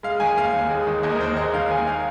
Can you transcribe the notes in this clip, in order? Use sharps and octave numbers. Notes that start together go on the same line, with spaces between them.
G#3 F5
D#3 G#5
D#2 F5
D#2
G#3
D#3
D#2 D#5
A#4
D#2 C5
G#3 D#5
D#3 F5
D#2 G#5
F5